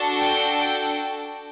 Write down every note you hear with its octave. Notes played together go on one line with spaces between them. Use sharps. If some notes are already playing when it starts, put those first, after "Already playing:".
Already playing: D4 F#4 A4
G5
G5